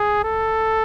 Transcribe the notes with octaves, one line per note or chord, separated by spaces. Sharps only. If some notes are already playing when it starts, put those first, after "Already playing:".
Already playing: G#4
A4